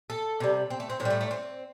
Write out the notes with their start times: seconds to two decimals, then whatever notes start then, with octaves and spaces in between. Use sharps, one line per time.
0.10 A4
0.40 C3 G3
0.70 C4
0.80 A3
0.90 C4
1.00 A2 C4
1.05 G3
1.10 A3
1.21 A3
1.31 C4